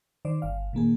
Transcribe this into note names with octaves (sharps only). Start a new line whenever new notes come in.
D#3 C5 D5
G1 F5
A#2 D#3 A#3 G#4